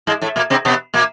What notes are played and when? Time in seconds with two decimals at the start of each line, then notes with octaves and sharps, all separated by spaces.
0.07 G#2 G#3
0.22 A2 A3
0.36 A#2 A#3
0.50 C3 C4
0.65 B2 B3
0.94 A#2 A#3